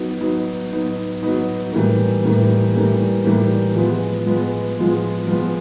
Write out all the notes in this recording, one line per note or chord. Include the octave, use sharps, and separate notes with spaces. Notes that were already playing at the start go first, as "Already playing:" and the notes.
Already playing: F#3 B3 D#4
F#3 B3 D#4
F#3 B3 D#4
F#3 B3 D#4
A2 E3 G3 A#3
A2 E3 G3 A#3
A2 E3 G3 A#3
A2 E3 G3 A#3
F3 G#3 B3
F3 G#3 B3
F3 G#3 B3
F3 G#3 B3